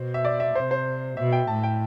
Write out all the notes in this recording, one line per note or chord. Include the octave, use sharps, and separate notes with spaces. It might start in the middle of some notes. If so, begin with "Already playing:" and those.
Already playing: B2 C5
E5
D5
E5
C3 C5
C5
B2 E5
G5
A2 A5
G5